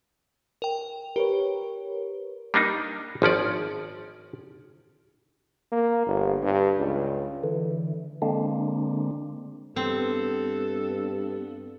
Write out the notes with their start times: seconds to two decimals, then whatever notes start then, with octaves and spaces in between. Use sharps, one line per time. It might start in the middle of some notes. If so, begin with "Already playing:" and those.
0.62 A#4 G5
1.16 G4 A#4 B4 C#5
2.54 G3 A#3 D4 D#4
3.22 G#1 F3 C#4 D5
5.72 A#3
6.07 G1
6.43 G2
6.78 C#2
7.43 D3 E3
8.22 D3 G#3 A#3 C4 D4
9.76 G2 B3 C4 A4